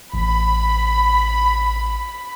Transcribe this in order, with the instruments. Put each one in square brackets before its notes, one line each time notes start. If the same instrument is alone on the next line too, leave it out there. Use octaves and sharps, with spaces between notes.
[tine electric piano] A1 [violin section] B5